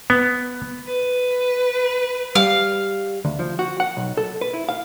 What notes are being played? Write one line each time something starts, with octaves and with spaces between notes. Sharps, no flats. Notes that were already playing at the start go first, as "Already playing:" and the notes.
B3
B4
G3 F5
D2
F3
F#4
F#5
B1
A4
B4
E4
F5